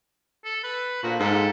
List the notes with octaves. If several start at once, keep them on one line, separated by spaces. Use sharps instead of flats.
A4
B4
A#2 D3 F3 F#4
G#2 A4 A#4 G5